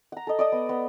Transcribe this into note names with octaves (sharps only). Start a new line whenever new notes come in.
F#5 A#5
A4 D#5
D5 D#5 D#6
B3
B3